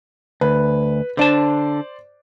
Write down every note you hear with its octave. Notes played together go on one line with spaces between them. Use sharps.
D2 B4
D3 D4 C5 D5 A5